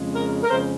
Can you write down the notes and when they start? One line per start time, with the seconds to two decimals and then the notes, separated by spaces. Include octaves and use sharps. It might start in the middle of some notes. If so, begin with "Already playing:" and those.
Already playing: F2 C#3 G#3
0.12 A#4
0.44 A#4
0.50 F2 C#3 G#3 C5